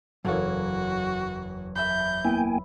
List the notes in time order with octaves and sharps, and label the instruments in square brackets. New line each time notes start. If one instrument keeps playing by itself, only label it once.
[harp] F#1 E2 C#5 [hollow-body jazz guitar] F#3 A4 F5 [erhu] F#4
[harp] E5 B5 [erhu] G6
[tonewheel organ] A#3 G5 G#5 [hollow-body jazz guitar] B3 E4